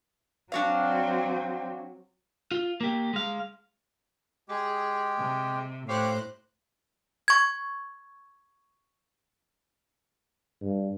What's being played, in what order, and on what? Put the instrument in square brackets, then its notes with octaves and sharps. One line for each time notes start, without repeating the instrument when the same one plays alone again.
[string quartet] F#3 C4 [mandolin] D4 F#4 F5
[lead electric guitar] F4
A#3 G4
G#3 F5
[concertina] G#3 G4 [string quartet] G#4
[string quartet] C3
[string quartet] A2 C5 F#6 [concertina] G4 C#5 F5
[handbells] C#6 G#6
[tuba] G2